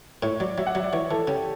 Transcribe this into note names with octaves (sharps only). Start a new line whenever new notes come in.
A2 C#5
F#3 D5
F#3 E5
F#5
F#3 E5
D5
E3 C#5
E3 A4
C#3 G4